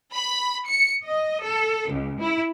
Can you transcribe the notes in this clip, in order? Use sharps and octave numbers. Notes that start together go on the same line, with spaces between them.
B5
C#7
D#5
A4
C#2
E4